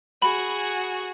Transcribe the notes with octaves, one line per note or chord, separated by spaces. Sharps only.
F#4 G#4 B5